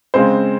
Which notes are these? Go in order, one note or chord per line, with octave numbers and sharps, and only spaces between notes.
C#3 G#3 C4 C5